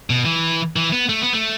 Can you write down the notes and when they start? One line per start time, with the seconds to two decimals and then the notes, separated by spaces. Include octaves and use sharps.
0.10 B2
0.25 E3
0.76 E3
0.93 B3
1.09 A3
1.21 B3
1.33 A3